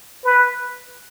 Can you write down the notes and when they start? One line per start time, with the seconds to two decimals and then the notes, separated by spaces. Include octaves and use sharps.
0.24 B4